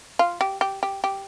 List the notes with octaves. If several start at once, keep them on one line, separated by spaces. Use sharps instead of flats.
F4
G4
G4
G4
G4